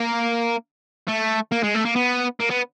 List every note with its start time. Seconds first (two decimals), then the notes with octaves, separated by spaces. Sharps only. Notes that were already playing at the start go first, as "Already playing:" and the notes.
Already playing: A#3
1.08 A3
1.52 A#3
1.63 G#3
1.74 A3
1.85 A#3
1.96 B3
2.40 A#3
2.50 B3